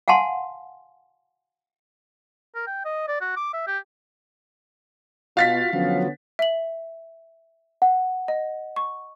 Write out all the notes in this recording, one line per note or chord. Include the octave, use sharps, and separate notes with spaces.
F5 F#5 G#5 A5 C6
A#4
G5
D#5
D5
F#4
D6
E5
G4
B2 F4 F#4 F5 A6 B6
D3 F3 F#3 B3 C#4
E5 F#7
F#5
D#5
C#6